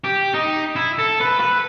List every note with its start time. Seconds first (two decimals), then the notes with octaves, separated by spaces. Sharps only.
0.04 G4
0.34 D#4
0.76 E4
0.98 A4
1.21 B4
1.40 B4